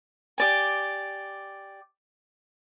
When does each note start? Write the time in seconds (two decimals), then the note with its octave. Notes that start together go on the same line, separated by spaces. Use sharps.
0.38 G4 D5 G#5